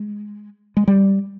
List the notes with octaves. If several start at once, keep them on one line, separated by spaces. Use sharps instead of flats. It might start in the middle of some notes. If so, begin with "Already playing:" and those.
Already playing: G#3
G#3
G3